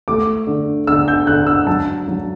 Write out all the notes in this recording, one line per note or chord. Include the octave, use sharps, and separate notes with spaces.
A3 D6
D3
D3 E6
G6
D3 F#6
E6
F#3 A5
F#3